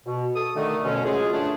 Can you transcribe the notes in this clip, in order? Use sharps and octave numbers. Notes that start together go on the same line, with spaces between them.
B2
A4 D#6
D3 D#3 A3
F#2 B2 D3 C#4
C#3 F#3 G#3 F4 G#4
G2 A3 D4